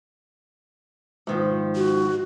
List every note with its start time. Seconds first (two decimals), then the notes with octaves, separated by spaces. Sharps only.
1.27 G#2 D#3 F3
1.75 F#4